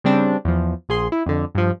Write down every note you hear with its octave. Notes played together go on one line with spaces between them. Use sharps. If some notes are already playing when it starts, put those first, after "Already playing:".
C#3 G3 C4 D4
E2 F3
A#1 G#4 C6
E4
F2 D3
G2 F3